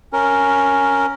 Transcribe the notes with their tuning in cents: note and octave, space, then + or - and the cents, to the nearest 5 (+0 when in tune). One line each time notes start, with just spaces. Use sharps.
C#4 +0 A#4 +0